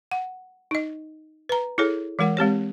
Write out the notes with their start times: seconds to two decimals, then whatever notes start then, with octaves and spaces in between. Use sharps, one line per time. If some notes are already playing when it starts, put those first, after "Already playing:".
0.11 F#5
0.71 D#4 D#5
1.49 B4 A#5
1.78 E4 G#4 A4 C#5
2.19 E3 G#3 A#4 F#5
2.37 G#3 C4 G4 C#5